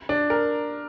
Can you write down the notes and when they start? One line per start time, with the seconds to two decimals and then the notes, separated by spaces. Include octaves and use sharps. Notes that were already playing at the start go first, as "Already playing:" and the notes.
0.09 D4
0.30 A#4